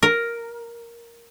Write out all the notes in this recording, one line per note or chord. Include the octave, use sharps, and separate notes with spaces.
A#4